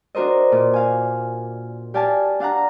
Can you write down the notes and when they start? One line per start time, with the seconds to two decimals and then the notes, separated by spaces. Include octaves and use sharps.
0.15 D4 F#4 A#4 C5 D#5
0.52 A#2
0.74 F5 G#5
1.94 G4 D5 F5 G#5 A5
2.40 D4 F5 F#5 A#5